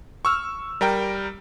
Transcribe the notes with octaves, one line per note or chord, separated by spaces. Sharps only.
C#6 E6 F6
G3 A#4 G5